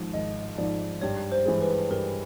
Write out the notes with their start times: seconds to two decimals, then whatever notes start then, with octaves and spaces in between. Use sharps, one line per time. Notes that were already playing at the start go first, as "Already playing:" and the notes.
Already playing: G#1 G#2 F3
0.13 G#1 D#5
0.58 G#2 F3 D5
1.01 G2 C#5
1.32 C5
1.45 E3 G#3
1.61 B4
1.90 G2 A#4